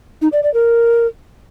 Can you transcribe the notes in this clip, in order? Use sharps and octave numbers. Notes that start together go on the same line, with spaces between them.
D#4
D5
D5
A#4